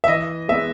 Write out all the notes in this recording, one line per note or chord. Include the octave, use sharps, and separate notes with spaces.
E5
E3 D#5
G#3 B3 E5